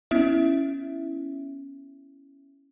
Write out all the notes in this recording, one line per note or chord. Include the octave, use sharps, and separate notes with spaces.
B3 C#4 E4 E5